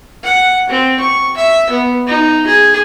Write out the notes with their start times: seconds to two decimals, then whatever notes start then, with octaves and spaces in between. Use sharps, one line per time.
0.24 F#5
0.69 C4
1.00 C#6
1.37 E5
1.70 B3
2.07 D#4
2.47 G#4